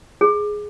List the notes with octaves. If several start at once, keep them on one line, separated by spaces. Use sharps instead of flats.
G#4